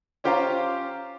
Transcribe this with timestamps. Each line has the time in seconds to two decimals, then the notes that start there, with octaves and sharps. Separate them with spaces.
0.24 C#4 F4 G4 C5 F5 A#5